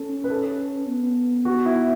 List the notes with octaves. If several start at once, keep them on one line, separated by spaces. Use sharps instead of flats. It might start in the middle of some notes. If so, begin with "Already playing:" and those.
Already playing: C#4 A4
B4
A4
B3
F#4
E4